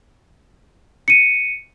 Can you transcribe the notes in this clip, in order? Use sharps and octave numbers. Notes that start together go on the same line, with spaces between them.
C#7 D#7